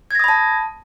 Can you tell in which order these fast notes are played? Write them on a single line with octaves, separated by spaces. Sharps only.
G#6 A#6 D#6 B5 A5